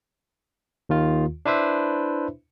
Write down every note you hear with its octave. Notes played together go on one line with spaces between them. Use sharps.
D#2 D#3 F4
D4 E4 B4 C5 E5